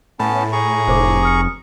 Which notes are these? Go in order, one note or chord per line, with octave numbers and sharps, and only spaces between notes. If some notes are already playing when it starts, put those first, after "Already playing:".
A2 B3 C#4 A5 B5
G#4 A#5 C#6
F1 C5 D6
D#6 F6 C#7